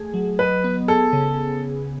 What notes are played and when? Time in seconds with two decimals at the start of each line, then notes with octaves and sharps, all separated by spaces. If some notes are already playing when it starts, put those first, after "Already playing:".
Already playing: A3 G#4
0.14 F#3
0.39 B4 D#5
0.64 B3
0.88 G#4 A4
1.13 C#3